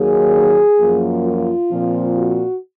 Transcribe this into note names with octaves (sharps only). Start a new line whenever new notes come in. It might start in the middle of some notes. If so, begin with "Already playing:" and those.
Already playing: D#2 D#3 F#3 A#3 G#4
F#2 F3 A#3
F4
A#2 F3 C4
F#4